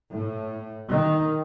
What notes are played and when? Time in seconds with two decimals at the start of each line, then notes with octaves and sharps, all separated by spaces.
0.11 A2
0.90 D#3